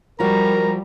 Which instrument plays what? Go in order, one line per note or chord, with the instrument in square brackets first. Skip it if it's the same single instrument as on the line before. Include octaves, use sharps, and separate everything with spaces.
[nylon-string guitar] F3 F#4 [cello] G3 [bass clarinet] A#4 [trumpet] A#5